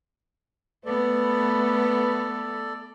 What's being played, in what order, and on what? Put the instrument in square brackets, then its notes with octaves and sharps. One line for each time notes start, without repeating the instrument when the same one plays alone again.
[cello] A3 B3 [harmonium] A4 D5 [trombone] B4